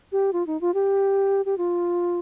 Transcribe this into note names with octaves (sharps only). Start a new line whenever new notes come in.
G4
F4
D#4
F4
G4
G4
F4